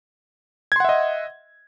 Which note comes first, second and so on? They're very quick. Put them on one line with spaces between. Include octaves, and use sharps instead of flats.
G#6 C6 F#5 E5 D#5